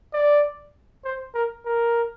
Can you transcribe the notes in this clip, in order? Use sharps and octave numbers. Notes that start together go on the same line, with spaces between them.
D5
C5
A#4
A#4